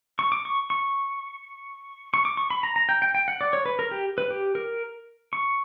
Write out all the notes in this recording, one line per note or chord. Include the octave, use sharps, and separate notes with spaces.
C#6
D6
C#6
C#6
C#6
D6
C#6
B5
A#5
A#5
G5
G5
G5
F#5
D5
C#5
B4
A#4
G4
B4
G4
A#4
C#6